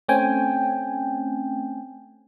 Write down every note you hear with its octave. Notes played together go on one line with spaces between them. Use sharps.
A3 C4 C#4 G5 G#5